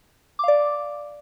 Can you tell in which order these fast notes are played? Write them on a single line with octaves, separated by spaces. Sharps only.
D6 F5 D5